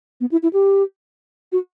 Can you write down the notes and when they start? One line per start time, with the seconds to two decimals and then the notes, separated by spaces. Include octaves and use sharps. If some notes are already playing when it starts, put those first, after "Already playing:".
0.21 B3
0.32 E4
0.43 E4
0.53 G4
1.52 F#4